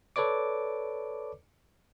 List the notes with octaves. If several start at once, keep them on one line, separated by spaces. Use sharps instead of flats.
A4 B4 C#5 D5 D6